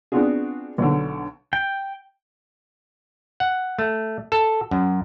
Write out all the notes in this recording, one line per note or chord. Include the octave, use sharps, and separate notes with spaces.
B3 C4 D4 F4 F#4 G#4
B1 D3
G5
F#5
A3
A4
F#2